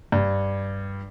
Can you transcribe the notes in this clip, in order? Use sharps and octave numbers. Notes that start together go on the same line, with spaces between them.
G2